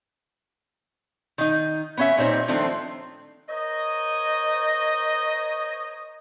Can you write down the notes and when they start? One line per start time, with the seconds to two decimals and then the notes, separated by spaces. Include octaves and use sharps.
1.38 D#3 D#4
1.97 B3 C#4 E5
2.18 A#2 G3 C4 D#4 C#5
2.48 D#3 F3 A3 C4 D4
3.49 A#4 C5 C#5 D#5